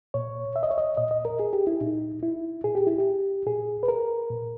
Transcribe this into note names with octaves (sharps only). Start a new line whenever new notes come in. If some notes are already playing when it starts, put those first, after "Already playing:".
A#2 C#5
E5
D#5
C#5
D#5
A#2 D#5
D#5
A#4
G#4
G4
E4
A#2 D#4
E4
A#2 G#4
G4
E4
G4
A#2 G#4
B4
A#4
A#2